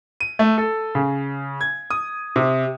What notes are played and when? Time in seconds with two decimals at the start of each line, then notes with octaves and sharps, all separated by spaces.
0.20 D#7
0.39 A3
0.58 A4
0.95 C#3
1.61 G#6
1.90 D#6
2.36 C3